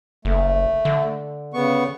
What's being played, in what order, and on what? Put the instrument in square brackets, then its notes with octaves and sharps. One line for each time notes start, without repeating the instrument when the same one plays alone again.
[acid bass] F#1 [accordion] A3
[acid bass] D3
[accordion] C#3 B3 C#6